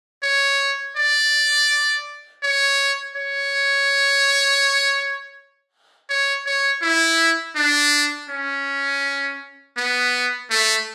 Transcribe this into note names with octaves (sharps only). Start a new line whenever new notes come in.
C#5
D5
C#5
C#5
C#5
C#5
E4
D4
C#4
B3
A3